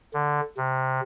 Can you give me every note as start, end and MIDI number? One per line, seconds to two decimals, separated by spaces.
0.14 0.41 50
0.57 1.01 48